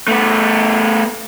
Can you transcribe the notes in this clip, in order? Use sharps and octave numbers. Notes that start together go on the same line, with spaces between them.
A3 B3